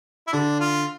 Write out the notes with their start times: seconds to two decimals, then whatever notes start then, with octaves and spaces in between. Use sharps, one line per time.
0.28 E4
0.32 D3 D4
0.60 F4